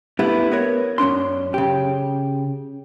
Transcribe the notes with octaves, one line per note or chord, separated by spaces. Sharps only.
A3 B3 D4 E4 G4
B3 A#4 C#5
F#2 C#4 D4 C6
C#3 G4